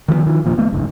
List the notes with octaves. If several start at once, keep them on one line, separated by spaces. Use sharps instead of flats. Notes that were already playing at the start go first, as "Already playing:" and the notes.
D#3 F3 G3 B3
D#3 F3
F1 A#2 F3
A3 B3
F#1 C#2 G#2